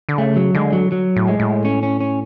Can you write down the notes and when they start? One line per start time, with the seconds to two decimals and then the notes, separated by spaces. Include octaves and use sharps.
0.09 D3
0.18 C#3 A3
0.36 F#3
0.55 D3 G#3
0.73 F#3
0.92 F#3
1.16 A2
1.28 G#3
1.40 A2
1.65 C#4
1.83 C#4
2.01 C#4